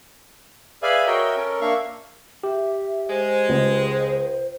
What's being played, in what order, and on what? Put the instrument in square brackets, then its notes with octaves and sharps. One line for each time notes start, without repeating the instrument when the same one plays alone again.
[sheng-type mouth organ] G#4 B4 D5 E5 F5 G#5
F#4 A#4 C#5 D#5 E5 G5
C#4 A4 A#4
A#3 D4 E5 F5 C#6
[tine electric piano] G4 [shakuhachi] E5
[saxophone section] G#3 [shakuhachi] C5
[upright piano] C#2